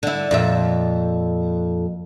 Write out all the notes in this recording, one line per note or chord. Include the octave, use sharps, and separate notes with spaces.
D3 E4
F2 A#2 E5